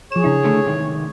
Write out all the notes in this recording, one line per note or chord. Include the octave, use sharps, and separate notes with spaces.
F3 G#4 C#5 E7
C#3 D4 E4
D3 A3
G#2 C3 D#3